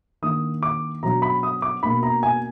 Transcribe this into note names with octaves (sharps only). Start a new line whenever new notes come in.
D#3 A#3 D4 D#6
D6
B2 F#3 D4 A#5
B5
D#6
D6
B2 A#3 D4 B5
A#5
G#5